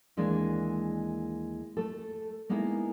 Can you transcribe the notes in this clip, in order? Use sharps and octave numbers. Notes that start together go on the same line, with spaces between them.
D#2 E3 G#3 A#3 D4
A3 A4
G#3 A#3 B3 D#4 E4